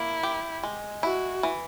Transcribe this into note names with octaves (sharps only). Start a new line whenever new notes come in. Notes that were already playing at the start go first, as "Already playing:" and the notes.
Already playing: A#3 E4
G4
G#3
E4 F#4
E3